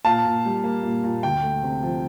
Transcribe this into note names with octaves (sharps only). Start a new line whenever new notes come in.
A#2 F5 A5
A#2
G3
A#3
A#2
A#2
D2 G5
A3
C3
F3